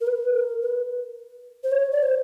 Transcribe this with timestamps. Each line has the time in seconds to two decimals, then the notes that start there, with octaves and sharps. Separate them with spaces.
0.01 A#4
0.07 B4
0.34 A#4
0.62 B4
1.64 C5
1.72 C#5
1.92 D5
2.03 C5